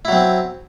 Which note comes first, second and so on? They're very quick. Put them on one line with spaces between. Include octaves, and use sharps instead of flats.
E4 F#3 C4